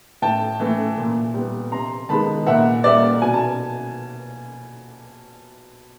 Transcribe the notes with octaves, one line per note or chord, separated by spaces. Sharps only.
A2 G5 A5
E3 A3
A#2
G3 B3
C3 A#5 C6
D#3 G#3 B3 A5 B5
A#2 E5 F#5
G3 A#3 D5 E5
B2 G#5
A5